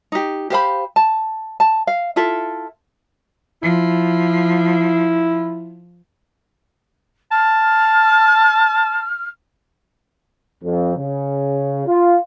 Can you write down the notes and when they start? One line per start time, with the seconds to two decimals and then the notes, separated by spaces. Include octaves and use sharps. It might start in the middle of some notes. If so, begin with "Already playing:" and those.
0.12 D#4 G4
0.50 G4 C5 F5 B5
0.96 A5
1.60 A5
1.87 F5
2.16 E4 F4 A4 E5
3.62 F3 E4
7.32 A5 F6
10.64 F2
10.97 C#3
11.86 F4